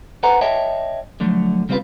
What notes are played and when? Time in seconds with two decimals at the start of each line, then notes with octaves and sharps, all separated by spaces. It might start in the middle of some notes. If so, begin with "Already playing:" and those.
0.23 A4 B4 C5 F#5 G#5 A#5
0.41 C#5 D#5 E5 G5 A5
1.20 D3 F3 F#3 A3
1.69 C#3 G3 C4 E4 F4 B4